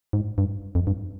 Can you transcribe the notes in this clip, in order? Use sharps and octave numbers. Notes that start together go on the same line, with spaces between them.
G#2
G2
F2
G2